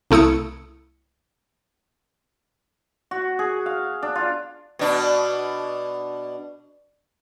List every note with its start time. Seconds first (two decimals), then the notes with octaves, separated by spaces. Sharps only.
0.11 C2 A3 E4 D#6 C#7
3.11 F#4
3.39 G#4
3.66 F5
4.03 D4
4.15 F4
4.79 B2 D4